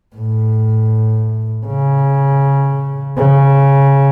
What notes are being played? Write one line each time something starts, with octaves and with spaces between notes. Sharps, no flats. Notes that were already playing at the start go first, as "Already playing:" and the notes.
A2
C#3
C#3